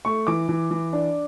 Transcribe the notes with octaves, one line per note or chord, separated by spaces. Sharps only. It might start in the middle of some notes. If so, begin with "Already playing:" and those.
A3 C#6
E3 D6
E3
E3
D4